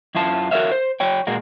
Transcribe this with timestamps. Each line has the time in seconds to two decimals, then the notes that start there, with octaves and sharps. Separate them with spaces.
0.15 F#2 E4 F4 A5
0.51 F#4 A#4 B4 C#5 E5 F5
0.72 C5
1.00 F#3 C#5 G5
1.27 A#2 G#3 A#3 F#4